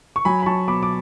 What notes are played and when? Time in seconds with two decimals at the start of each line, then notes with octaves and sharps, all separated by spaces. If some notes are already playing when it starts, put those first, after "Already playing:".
0.16 C#6
0.25 F#3 G#5 B5
0.43 B5
0.46 F#3 A5 C#6
0.68 B2 B5 D6
0.83 D6